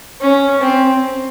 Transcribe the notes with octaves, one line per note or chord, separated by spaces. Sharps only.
C#4
C4